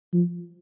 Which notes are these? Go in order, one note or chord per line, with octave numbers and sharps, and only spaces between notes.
F3